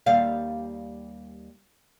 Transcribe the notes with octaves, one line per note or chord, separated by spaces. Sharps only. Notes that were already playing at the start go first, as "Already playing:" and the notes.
D#2 G3 F5